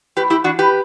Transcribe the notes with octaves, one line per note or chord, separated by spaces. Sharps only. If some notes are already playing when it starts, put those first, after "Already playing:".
A2 G4 B4
E4 G4
E3 D4 F#4
G4 B4